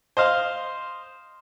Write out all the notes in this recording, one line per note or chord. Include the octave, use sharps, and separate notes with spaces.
C5 D#5 F5 D#6